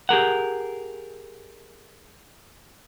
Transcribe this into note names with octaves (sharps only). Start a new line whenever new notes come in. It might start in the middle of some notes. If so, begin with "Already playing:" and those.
G4 G#4 A#4 F#5